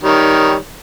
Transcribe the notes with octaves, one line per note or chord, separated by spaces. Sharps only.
D#3 G3 C#5